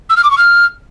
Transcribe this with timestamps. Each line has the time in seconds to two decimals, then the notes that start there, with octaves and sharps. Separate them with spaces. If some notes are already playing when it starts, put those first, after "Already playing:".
0.10 E6
0.17 F6
0.24 D6
0.31 C#6
0.38 F6